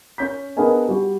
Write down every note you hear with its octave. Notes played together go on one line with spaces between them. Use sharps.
C#4 G6 B6
B3 D4 G#4 A#4 D#5 G#5
G3 F#4